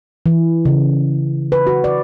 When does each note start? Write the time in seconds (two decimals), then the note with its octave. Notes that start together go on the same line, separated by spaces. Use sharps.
0.26 E3
0.65 C#3
1.52 B4
1.67 F#4
1.84 D5